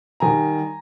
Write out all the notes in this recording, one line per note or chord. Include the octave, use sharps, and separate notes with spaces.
D#3 G3 G#5 A#5